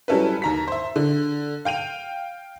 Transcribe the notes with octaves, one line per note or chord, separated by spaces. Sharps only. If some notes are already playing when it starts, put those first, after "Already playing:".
F#3 G3 C#4 E4 A4 B4
D#2 A#5 B6
C5 E5
D3
F5 G5 D#7 F7